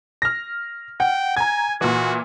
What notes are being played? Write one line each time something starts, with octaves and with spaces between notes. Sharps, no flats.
F6 A#6
F#5 G5
G#5 A#5 G#6
A#2 E3 F#4